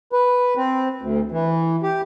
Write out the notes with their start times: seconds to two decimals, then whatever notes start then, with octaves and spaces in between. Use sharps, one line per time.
0.12 B4
0.57 C4
1.02 D2
1.32 E3
1.83 G4